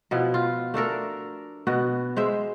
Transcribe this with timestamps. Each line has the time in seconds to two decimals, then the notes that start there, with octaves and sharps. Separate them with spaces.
0.11 B2 F3 B3 E4
0.34 F4
0.74 A3 D4 A4 A#4
1.67 B2 B3 F#4
2.17 G#3 C5 E5